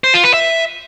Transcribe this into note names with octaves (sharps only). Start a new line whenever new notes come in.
C5
F4
B4
E5